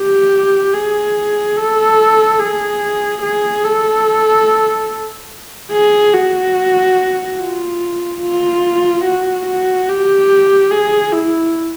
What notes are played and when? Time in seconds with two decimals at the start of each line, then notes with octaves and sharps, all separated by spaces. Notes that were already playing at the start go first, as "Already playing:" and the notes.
Already playing: G4
0.73 G#4
1.56 A4
2.39 G#4
3.22 G#4
3.64 A4
5.72 G#4
6.14 F#4
7.39 F4
8.22 F4
9.04 F#4
9.46 F#4
9.88 G4
10.71 G#4
11.12 E4